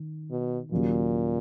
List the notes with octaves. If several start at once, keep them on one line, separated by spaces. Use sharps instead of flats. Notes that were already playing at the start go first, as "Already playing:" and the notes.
Already playing: D#3
B2
D#2 A#2 C#3 F#3